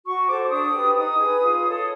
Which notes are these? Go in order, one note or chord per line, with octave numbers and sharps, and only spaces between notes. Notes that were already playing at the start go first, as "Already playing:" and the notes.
F#4 C#6
A4 C5 D6
D6
D4 D#6
G4 B4
D#4 D#6
G#4 B4
F4
A4 C#5